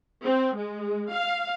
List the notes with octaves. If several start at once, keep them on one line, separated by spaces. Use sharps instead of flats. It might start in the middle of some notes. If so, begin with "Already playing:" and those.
C4
G#3
F5